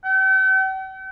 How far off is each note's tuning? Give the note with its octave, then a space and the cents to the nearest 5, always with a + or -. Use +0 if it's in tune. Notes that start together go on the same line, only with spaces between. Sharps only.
G5 -45